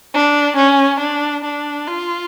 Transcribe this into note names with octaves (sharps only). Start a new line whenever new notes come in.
D4
C#4
D4
D4
F4